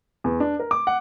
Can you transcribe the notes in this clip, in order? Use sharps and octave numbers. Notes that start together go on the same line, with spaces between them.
E2
D4
A#4
D6
F#5